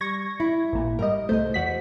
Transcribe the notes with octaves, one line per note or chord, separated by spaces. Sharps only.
G3 C#6 G#6 A#6
E4
A1 A#2
G#2 G3 A#4 D#5
C2 A3 C5 D#5
E2 F#4 B6